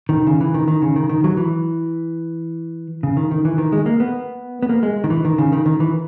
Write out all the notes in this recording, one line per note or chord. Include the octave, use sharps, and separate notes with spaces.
D#3
C#3
E3
D#3
D#3
C#3
D#3
D#3
F#3
E3
C#3
D#3
D#3
E3
D#3
G#3
A#3
B3
B3
A#3
G#3
D#3
E3
D#3
C#3
D#3
D#3
E3